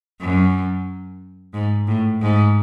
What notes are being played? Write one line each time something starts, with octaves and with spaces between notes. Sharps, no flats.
F#2
G#2
A2
G#2